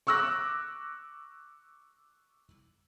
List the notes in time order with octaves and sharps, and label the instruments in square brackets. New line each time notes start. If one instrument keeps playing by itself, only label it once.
[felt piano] C#6 D6 E6 F#6 A#6